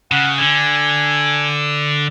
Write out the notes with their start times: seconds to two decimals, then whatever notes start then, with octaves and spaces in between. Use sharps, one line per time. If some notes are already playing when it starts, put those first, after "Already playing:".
0.12 C#3 F#5
0.38 D3 G#5